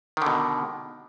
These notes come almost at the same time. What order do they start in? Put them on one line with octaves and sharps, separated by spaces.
D#3 D3 B2